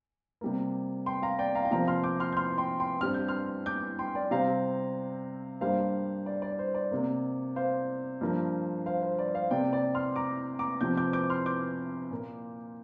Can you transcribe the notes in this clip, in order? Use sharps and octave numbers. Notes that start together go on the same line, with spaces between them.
C3 G3 A#3
G5 C6
F5 A#5
D5 G5
F5 A#5
G5
C3 F3 A#3 F5 A#5
C6 F6
D6 G6
C6 F6
G6
C6 F6
G5 C6
G5 C6
G2 G3 C4 F6
G6
C6 F6
D6 G6
G5 C6
D5 G5
C3 G3 C4 F5 A#5
G2 G3 A#3 C5 F5
D5
D5
C5
D5
C3 A#3
C5 F5
G2 F3 A#3
C5 F5
C5
D5
C5 F5
C3 A#3 D5 G5
D5 G5
C6 F6
A#5 D6
A#5 D6
C3 F3 C4 D6 G6
D6 G6
D6 G6
C6 F6
D6 G6
A#2 A#3